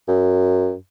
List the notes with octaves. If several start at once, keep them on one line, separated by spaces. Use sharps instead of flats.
F#2